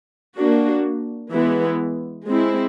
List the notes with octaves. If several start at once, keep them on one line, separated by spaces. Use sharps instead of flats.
A#3 D4 F#4
E3 G#3 B3 E4
G#3 C4 E4